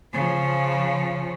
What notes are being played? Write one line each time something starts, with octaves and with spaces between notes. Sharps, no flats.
C#3 F3